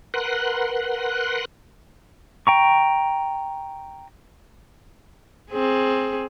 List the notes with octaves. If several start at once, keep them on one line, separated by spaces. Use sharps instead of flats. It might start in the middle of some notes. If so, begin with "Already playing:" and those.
A#4 B4 F#5 C6 F#6
G5 A#5 C#6
C4 G#4